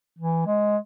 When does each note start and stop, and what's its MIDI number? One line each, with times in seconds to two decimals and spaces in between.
0.19 0.45 52
0.46 0.77 56